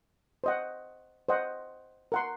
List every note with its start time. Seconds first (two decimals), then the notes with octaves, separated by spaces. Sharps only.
0.44 C5 D#5 F#5
1.29 C5 D#5 F#5
2.12 A#4 F#5 C6